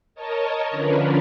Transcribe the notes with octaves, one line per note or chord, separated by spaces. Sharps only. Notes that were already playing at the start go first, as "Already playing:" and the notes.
A#4 C#5 D#5 A5
D3 F3 C#4 D4 A#4 B4